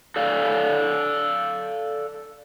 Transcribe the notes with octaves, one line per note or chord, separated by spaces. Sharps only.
A4 D5 F5